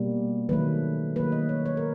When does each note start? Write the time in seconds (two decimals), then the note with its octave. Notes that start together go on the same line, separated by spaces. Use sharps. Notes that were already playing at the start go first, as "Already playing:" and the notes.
Already playing: B2 G3 A#3
0.49 D#3 F#3 A3 B4
1.16 D#3 F#3 A#3 B4
1.32 D#5
1.49 C#5
1.66 C#5
1.77 A#4